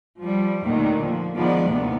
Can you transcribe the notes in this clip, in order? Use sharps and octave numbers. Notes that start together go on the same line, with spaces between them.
F3 G3
D#2 A#2 D3 D#3 A3
F3 A#3
D#3 F3 G#3 B3 D4 D5
D#2 A2 C3 B3